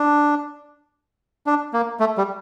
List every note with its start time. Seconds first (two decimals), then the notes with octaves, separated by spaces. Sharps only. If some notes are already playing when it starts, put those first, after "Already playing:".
Already playing: D4
1.47 D4
1.73 A#3
2.00 A3
2.18 G3